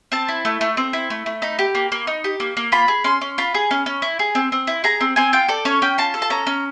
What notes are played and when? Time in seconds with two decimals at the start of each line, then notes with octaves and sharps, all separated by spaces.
0.12 C4 A5
0.28 E4
0.45 A3
0.61 A3
0.77 C4
0.93 E4
1.10 A3
1.26 A3
1.42 D#4 B5
1.59 G4
1.75 A#3
1.92 A#3
2.07 D#4
2.24 G4
2.40 A#3
2.57 A#3
2.72 F4 B5
2.88 G#4
3.04 C#4 C6
3.21 C#4
3.38 F4 B5
3.54 G#4
3.71 C#4
3.86 C#4
4.02 E4
4.19 G#4
4.35 C4
4.52 C4
4.67 E4
4.84 G#4 A#5
5.01 C4
5.16 C4 G#5
5.33 F4 G5
5.49 A4 D5
5.65 C#4 C#5
5.82 C#4 G5
5.98 F4 A5
6.14 A4
6.22 A5
6.30 C#4 A#5
6.47 C#4